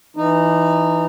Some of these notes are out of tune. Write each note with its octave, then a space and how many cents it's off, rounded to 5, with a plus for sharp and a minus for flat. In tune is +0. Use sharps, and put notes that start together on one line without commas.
E3 +0 D#4 -15